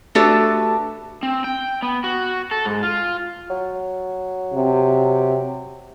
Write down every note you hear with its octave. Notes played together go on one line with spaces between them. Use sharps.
A3 D4 F#4 G4 A4 B4
C4
G5
B3
F#4
A4
G#2
F4
F#3
C3